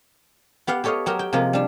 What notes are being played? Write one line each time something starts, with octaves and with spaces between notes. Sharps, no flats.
B3 G4 F5 F#5
G4 A4 C#5 D#5 F5
F#3 G4 A#4
G5
C3 F3 G#3 A#3
G3 D4